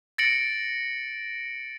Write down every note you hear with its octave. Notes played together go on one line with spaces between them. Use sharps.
A6 A#6 C#7 D7 F#7